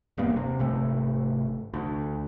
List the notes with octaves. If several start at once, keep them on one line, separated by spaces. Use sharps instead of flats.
D#1 G2 A#3 B3
C3
G#1 C3 A3
D2